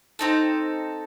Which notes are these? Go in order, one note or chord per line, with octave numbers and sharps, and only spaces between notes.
C4 D#4 A4